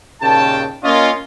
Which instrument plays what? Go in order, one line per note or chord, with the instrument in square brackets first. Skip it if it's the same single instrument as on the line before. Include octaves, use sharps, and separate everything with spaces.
[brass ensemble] D#2 A#2 C#3 G5 A5
A#3 C#4 F4 D#5